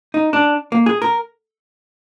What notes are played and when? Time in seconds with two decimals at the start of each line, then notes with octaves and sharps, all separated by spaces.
0.14 D#4
0.33 D4
0.72 A#3
0.86 G#4
1.02 A#4